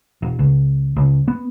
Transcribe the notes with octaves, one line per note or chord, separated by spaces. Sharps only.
E1
C#2
C#2
B3